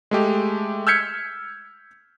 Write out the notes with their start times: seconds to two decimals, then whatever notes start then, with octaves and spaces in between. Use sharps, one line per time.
0.11 G#3 A3 G4
0.87 E6 F6 G6 G#6 B6 C#7